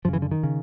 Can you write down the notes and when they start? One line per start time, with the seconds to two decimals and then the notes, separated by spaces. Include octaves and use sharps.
0.05 F#2 F3
0.08 C#3 E3
0.22 D3
0.31 D#3
0.43 C#3